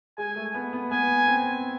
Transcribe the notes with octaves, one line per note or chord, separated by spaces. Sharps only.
G#3 G#5
A3
B3
B3
B3 G#5
C4